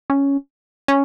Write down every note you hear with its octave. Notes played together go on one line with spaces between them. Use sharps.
C#4
C#4